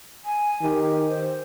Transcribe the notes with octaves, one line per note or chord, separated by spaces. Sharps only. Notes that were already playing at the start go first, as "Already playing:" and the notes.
G#5
D#3 G4
C5